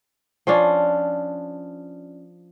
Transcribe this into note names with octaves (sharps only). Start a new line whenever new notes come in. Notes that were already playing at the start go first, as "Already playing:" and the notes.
F3 C#4 D4